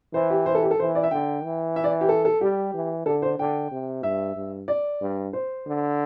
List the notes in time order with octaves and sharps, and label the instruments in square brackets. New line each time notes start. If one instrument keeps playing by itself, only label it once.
[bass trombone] E3 [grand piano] C5
[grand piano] G4
C5
A4
G4
A4
[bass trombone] E3 [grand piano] C5
[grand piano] D5
E5
[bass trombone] D3 [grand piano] G5
[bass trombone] E3
[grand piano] E5
D5
G4
A4
A4
[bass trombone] G3 [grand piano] G4
[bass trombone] E3
[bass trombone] D3 [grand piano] A4
[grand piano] C5
[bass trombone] D3 [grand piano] G5
[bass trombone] C3
[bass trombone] G2 [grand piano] E5
[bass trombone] G2
[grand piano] D5
[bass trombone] G2
[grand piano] C5
[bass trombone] D3